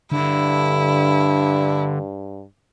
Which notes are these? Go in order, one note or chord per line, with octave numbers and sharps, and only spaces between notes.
G2 D3 E4